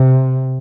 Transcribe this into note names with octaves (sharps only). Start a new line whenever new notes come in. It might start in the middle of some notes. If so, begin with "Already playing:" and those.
Already playing: C3